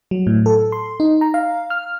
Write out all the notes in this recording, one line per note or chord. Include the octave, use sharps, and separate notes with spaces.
F#3
A2
A4
C6
D#4
A#5
F5
F6